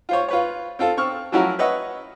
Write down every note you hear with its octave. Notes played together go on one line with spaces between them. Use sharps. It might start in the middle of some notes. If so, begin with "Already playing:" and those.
F4 C5 C#5
F4 B4 C#5
C4 F4 A4
C4 C#6 E6 F6
F3 F#3 C#4 E4 F#4 A#4
B4 C#5 D#5 E5 F#5